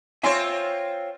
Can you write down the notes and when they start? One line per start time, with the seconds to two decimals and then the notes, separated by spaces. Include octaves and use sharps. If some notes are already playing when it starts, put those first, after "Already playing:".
0.23 C4 F4 C#5 E5 G#5 C6